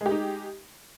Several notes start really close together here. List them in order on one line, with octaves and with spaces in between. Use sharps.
G#3 G4 D#4